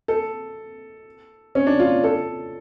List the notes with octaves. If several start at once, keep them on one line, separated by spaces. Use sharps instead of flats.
A4
C#4
D4
F4
A4